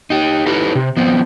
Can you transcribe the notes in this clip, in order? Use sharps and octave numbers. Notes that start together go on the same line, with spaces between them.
D#4 G4
D#4 E4 G4 A4 B4
C3
F3 B3 C4